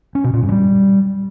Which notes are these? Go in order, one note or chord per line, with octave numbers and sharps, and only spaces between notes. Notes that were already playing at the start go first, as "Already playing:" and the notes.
C#4
B2
A#2
G2
G3